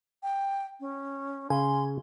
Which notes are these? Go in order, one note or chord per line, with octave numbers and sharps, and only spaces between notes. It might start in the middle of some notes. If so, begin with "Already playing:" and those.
G5
C#4
C#3 G#5 C6